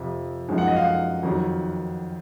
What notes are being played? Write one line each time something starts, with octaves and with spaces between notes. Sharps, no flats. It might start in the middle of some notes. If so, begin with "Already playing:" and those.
Already playing: F2 C3 F3
F#2 F3 G#3 D#4
F#5
D#5
F5
F#5
F2 D#3 F#3